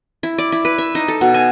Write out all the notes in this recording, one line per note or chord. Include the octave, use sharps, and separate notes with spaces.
E4
D5
E4
B4
E5
D#4
A4
B2
G#5